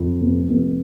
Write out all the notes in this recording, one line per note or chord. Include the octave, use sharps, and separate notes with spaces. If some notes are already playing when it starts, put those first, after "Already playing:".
Already playing: F2
F1
F1